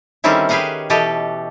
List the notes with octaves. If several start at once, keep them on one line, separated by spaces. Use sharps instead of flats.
D3 D#3 G3 C4 C#4 E4
G4 G#4 B4 D#5 F5 F#5
B2 E3 G4 A4 D#5